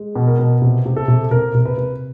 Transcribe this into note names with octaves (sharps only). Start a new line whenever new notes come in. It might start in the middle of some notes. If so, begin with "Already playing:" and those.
Already playing: G#3
B2
A#4
B2
C3
C3
A4
C3
C3 A#4
C3
B4
C3